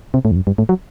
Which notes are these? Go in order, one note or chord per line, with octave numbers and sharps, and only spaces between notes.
C3
A2
E2
F#2
G2
A2
F#3